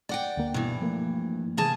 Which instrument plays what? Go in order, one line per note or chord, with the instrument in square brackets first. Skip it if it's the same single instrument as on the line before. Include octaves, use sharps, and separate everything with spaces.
[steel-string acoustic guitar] D5 F#5 G5
[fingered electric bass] D2 A#3
[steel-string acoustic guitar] G2 E3 [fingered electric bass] B2
[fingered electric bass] F3 A3 A#3
[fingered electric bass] C3 E3 [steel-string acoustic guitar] A#3 G#4 A5